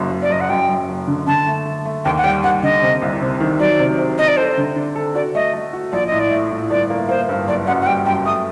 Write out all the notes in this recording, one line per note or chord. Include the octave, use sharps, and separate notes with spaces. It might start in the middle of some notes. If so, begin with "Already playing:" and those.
Already playing: F#1 F#2
F#1
D5
F#1 D#5
F#5
F#2 G5
F#2
F#1
D3
D3 A5
A3
A3
A3
D#2 G5
F#5
G3 G5
D#2 F#5
D3 D#5
C3
C2
C3
D#3
F#3 D5
C3
C3
C3 D#5
D5
A4 C5
D3
D4
A4
F#4 D5
A3 D#5
A3
F#4
A#1 D5
D#5
A2
D5
A3
A2
G1 D5
A#3
A#3 C5
G2
F#1 D5
F#2 F#5
F#5
G3 G5
F#2 G5
A3 D#6